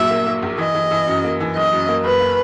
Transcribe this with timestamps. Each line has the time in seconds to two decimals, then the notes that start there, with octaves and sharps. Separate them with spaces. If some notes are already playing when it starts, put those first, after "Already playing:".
Already playing: A#1 A#2 F#3 E5
0.10 A#3
0.26 A#3
0.42 A#1
0.58 E3 D#5
0.75 E3
0.91 E3
1.07 F#2
1.24 A#3
1.40 E3
1.55 F#1 D#5
1.72 F#2
1.88 A#3
2.04 F#1 B4
2.20 A#3